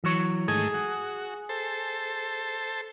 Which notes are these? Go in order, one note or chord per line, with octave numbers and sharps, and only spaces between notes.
E3 F#3 C#5
G#2 D#3 A3 G#4
F#4
A4 C5